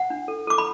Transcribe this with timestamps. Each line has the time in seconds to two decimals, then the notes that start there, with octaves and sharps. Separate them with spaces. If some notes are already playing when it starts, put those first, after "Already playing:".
Already playing: F#5
0.10 D4
0.28 A4
0.47 A4 D6
0.58 B5